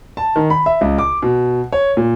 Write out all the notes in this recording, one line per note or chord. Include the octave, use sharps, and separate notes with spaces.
A5
D#3
B5
E5
C#2
D6
B2
C#5
A#2